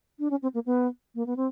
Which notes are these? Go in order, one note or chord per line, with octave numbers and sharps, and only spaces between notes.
D4
C#4
C4
A#3
B3
A#3
B3
C4